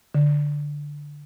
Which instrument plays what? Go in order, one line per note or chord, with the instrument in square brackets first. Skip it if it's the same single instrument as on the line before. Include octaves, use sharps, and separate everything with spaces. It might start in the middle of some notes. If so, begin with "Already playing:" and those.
[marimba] D3